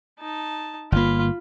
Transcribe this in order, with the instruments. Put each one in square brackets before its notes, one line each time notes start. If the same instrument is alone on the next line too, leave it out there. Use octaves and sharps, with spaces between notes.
[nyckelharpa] D#4 A5
[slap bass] G1 A#3 [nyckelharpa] F4 B5